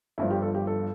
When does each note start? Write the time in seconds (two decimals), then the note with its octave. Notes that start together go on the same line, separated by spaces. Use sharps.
0.18 G1 G2 F3 E4
0.31 G4
0.42 A4
0.55 G4
0.67 A4